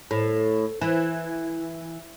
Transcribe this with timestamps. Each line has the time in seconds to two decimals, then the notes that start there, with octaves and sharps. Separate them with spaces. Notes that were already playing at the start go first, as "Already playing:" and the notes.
0.11 A2
0.81 E3